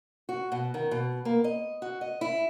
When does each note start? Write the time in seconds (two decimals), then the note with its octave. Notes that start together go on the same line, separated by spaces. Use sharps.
0.29 F#4
0.52 B2
0.74 D#3
0.91 B2
1.25 A#3
1.44 D#5
1.82 F#4
2.01 D#5
2.21 E4